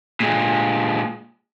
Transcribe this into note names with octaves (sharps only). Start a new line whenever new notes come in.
A#2 G#3